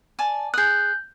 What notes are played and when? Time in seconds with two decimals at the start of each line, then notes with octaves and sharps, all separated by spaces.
0.19 D5 G#5 A5
0.54 G#4 D#6 F#6 G6